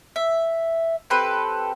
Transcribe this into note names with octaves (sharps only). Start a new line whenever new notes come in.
E5
C4 G4 A4 B4